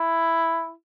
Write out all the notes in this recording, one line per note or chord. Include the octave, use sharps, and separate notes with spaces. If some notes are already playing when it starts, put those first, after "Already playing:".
Already playing: E4